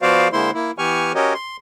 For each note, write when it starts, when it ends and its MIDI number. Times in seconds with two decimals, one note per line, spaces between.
0.02 0.28 53
0.02 0.28 59
0.02 0.28 66
0.02 0.28 72
0.02 0.28 74
0.02 0.28 77
0.33 0.51 50
0.33 0.51 56
0.33 0.51 58
0.33 0.51 64
0.33 0.51 72
0.33 0.51 84
0.54 0.71 58
0.54 0.71 64
0.78 1.12 52
0.78 1.12 59
0.78 1.12 67
0.78 1.12 80
0.78 1.12 85
0.78 1.12 89
1.15 1.34 61
1.15 1.34 66
1.15 1.34 67
1.15 1.34 70
1.15 1.34 73
1.15 1.34 75
1.34 1.57 84